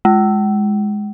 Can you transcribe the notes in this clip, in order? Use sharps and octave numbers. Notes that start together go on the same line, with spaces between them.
G#3